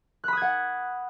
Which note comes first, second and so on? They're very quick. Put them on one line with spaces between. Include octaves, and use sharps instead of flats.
F#6 B5 D#6 G#6 F#5